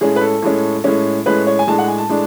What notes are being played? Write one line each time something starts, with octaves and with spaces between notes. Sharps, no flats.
A2 G#3 C#4 G#4
B4
A4
A2 G#3 C#4
A2 G#3 C#4
A2 G#3 C#4 B4
C#5
G#5
A2 G#3 D4 A5
F#5
G#5
A5
A2 G#3 D4